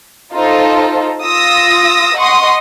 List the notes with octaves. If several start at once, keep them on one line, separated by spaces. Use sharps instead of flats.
D#4 F4 A4 C5
F4 D#6 E6 A#6
D#5 F#5 C6 C#6 D#6